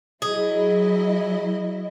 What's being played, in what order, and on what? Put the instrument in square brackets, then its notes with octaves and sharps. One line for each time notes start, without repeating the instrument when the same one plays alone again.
[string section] F#3 E4 D#5 [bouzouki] G#4